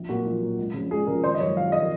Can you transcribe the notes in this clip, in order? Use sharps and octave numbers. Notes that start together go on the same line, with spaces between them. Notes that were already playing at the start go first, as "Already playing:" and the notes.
Already playing: A#1
A#2 F#3 F#4
A#1
A#2 F#3
C#2
C#3 F3
C#2 G#4
C#3 F3 A#4
G#1 C5
D#5
F#2 F3 C#5
G#1 F5
D#5
F3